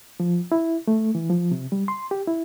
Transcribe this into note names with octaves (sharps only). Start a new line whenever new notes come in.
F3
E4
A3
E3
F3
C3
G3
C6
G4
E4